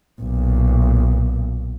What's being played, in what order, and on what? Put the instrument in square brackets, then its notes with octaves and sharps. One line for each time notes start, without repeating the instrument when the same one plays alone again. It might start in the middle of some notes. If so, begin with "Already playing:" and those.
[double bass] B1 A#2